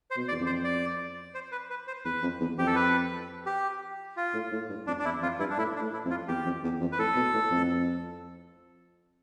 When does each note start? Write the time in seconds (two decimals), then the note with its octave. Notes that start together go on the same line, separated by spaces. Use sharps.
0.11 C5
0.17 B2
0.28 D5
0.31 E2
0.40 F2
0.46 C5
0.64 D5
1.34 C5
1.52 B4
1.70 B4
1.87 C5
2.05 E2 B4
2.22 F2
2.40 E2
2.58 F2 G4
2.67 A4
2.75 B4
3.46 G4
4.17 F4
4.34 A2
4.52 A2
4.70 G2
4.87 F2 D4
4.99 D4
5.05 E2 E4
5.22 F2 F4
5.39 G2 E4
5.50 D4
5.58 A2 E4
5.75 D4
5.81 A2
5.93 E4
6.05 F2
6.10 F4
6.28 E2 G4
6.45 F2
6.64 E2
6.80 F2
6.92 B4
6.98 A2 A4
7.16 B2
7.34 A2
7.51 F2